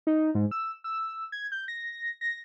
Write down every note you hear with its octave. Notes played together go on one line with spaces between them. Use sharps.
D#4
G#2
E6
E6
G#6
G6
A#6
A#6